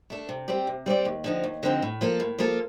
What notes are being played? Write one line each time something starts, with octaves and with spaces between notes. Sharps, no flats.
A3 D4 A4
C3
G3 C4 G4 D5
C3
G3 C4 G4 D5
D#2
D3 F3 C4 D#4
D#2
D3 F3 C4 D#4
A2
F3 A#3 F4 A4
A2
F3 A#3 F4 A4